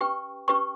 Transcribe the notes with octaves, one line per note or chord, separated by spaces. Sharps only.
C#4 G4 B4 G5 C#6
C#4 G4 B4 G5 C#6